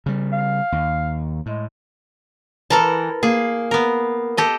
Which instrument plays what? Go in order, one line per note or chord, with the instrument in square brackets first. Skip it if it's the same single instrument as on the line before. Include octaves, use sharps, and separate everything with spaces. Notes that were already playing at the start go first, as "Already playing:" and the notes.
[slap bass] C#3 G3
[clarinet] F5
[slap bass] D#2
[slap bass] A2 [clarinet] G#3
[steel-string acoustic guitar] E3 [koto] A4 A#4 A5
[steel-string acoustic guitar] A#3 [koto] G#4
[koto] B3 A#4
G4 A4 D#5